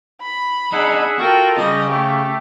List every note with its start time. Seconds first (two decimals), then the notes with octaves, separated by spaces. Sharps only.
0.21 B5
0.72 D4 D#4 G#4 E5 F#5
1.19 F4 F#4 A4 A#4 G5
1.58 C#3 G3 D#5
1.90 A3 G4